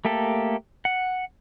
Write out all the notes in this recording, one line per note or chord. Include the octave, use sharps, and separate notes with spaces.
A3 A#3 G4 A4
F#5